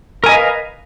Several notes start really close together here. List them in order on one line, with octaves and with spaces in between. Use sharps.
A#4 G#5 D#5 B4 F5